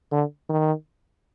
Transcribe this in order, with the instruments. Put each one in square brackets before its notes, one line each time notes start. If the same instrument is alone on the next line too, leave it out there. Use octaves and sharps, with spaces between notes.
[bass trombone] D3
D#3